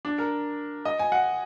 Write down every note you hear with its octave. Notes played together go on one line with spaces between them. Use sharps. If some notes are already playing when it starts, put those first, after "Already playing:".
D4
A#4
D#5
G#5
F#5